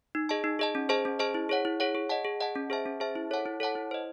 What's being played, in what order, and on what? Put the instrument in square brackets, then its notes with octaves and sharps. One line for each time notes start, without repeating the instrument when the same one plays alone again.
[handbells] D#4
G#4 D#5 A5
D#4
G#4 D#5 A5
C#4
G#4 C5 D#5 A5
C#4
G#4 C5 D#5 A5
E4
G#4 C#5 F#5
E4
G#4 C#5 F#5
G#4
D#5 F#5 A5
G#4
D#5 F#5 A5
C#4
G#4 C5 E5 A5
C#4
G#4 C5 E5 A5
E4
A4 C#5 F#5 A5
E4
A4 C#5 F#5 A5
E4
C5 D#5